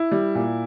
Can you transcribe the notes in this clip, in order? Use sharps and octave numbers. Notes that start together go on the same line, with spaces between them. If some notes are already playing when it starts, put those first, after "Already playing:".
Already playing: E4
G3
A#2